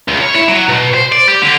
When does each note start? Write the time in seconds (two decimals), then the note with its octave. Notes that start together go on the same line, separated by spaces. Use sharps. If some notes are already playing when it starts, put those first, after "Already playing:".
0.08 C#2
0.21 C#5
0.35 E4
0.48 F#3
0.69 B2
0.94 C5
1.12 D5
1.28 G4
1.42 D3